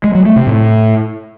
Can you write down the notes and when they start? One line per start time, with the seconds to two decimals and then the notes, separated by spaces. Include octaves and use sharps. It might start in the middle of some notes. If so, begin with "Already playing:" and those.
0.04 G#3
0.15 F#3
0.25 A3
0.36 C3
0.47 A2